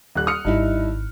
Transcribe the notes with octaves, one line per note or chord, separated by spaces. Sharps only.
D#1 F#6
D#6 F6 C#7
G#1 G2 D#4 E4